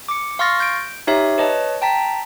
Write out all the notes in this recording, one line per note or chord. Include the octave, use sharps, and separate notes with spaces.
D6 C#7
F5 C6 C#6 F6 A6 A#6
G6 D7
D#4 G4 C#5 E5
B4 C#5 D#5 A5
G5 A5 A#5 B6